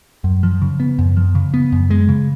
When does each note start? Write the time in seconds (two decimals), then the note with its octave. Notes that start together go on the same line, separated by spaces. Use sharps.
0.24 F#2
0.43 F3
0.62 C#3
0.80 B3
0.99 F#2
1.17 F3
1.35 C#3
1.54 B3
1.72 F#2
1.90 G#3
2.09 C#3